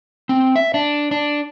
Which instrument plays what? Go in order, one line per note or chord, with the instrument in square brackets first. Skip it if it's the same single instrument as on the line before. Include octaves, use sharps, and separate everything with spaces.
[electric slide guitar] C4
E5
D4
D4